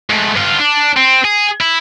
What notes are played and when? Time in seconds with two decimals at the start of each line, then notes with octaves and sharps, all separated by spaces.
0.10 G#2 A3
0.36 G2 F4
0.59 D4
0.97 C4
1.25 G#4
1.61 E4